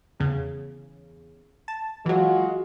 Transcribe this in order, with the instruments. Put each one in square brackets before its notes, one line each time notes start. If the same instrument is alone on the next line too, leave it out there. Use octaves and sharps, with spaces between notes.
[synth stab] E2 C#3
A5
[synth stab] E3 F#3 [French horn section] G#3 F4 F#4